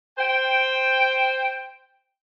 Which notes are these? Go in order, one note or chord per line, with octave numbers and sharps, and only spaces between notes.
C5 G5